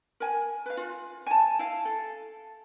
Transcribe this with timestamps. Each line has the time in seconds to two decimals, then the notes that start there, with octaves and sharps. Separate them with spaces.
0.20 A#4 G#5
0.66 B4 F5
0.77 F4
1.26 G#5 A5
1.59 E4 F5
1.85 A4